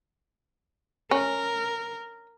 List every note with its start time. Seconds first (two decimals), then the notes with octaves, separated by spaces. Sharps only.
1.11 C#4 A#4